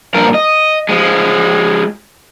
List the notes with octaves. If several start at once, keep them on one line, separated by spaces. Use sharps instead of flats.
G2 A#2 F3 A#4
D#5
F3 G#3